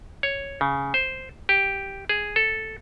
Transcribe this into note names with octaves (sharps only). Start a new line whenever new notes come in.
C#5
C#3
C5
G4
G#4
A4